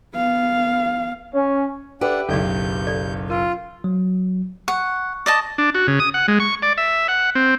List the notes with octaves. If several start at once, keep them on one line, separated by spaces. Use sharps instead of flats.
B3 F5
C#4
D4 G4 A4 B4 E5 F#5
F#1 B1 A4 D5 G6
A4 D5
F4 A#4 G#5
F#3
F#5 C#6
D5 D#5 A5
D4
F#4
C#3
D#6
F#5
G#3
C#6
D5
E5
F#5
C4